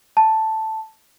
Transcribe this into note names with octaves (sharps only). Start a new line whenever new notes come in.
A5